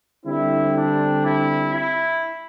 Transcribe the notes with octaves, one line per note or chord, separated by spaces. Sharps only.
D3 G3 C4 E4
D4
E4
E4